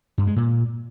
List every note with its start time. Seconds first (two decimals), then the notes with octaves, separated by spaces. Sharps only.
0.18 G2
0.27 G#3
0.36 A#2